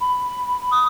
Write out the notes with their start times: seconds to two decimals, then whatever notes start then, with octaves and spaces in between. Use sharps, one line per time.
0.01 B5
0.72 D#6